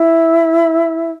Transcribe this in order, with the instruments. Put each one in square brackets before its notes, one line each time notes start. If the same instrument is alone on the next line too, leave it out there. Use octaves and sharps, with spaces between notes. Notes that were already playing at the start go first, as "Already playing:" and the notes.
Already playing: [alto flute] E4